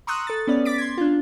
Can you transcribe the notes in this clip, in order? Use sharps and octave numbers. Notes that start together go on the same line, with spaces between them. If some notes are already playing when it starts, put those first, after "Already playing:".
A#5 C6 C#6 D#6 E6 F#6
A4 A6
B3 C#4 D5
D6 A6 B6 D7
C6 G#6
D4 F4